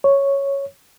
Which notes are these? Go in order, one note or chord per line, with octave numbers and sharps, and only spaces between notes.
C#5